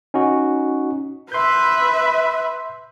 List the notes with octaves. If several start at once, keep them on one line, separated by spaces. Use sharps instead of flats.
C#4 D#4 F#4
B4 E5 C6 G6